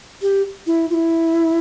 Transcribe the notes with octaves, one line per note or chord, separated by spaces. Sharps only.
G4
E4
F4
E4